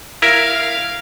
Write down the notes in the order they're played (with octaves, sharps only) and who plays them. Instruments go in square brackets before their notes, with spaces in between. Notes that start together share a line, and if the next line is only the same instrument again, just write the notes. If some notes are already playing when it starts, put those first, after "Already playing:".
[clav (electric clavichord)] E4 A#4 [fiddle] F5